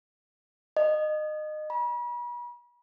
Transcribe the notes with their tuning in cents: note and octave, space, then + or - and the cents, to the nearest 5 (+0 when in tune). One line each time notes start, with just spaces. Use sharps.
D#5 -25
B5 -40